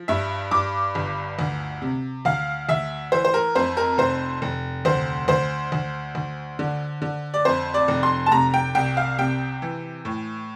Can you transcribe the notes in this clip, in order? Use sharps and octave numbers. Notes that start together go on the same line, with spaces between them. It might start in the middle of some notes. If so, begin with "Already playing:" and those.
Already playing: F3
G2 E5
G2 D6
G1
D2
C3
D2 F5
D2 E5
E3 C5
C5
A#4
F2 C5
A#4
F1 C5
F1
D2 C5
D2 C5
D2
D2
D3
D3
D5
F2 C5
D5
F1
C6
A5
C3 A#5
G5
C2 G5
F5
C3 G5
E3
A2